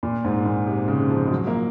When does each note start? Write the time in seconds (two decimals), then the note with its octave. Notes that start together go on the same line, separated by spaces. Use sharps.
0.03 A#2
0.25 G#2
0.46 A#2
0.67 C3
0.88 C#3
1.10 F3
1.26 G#3
1.32 F#3
1.47 A#3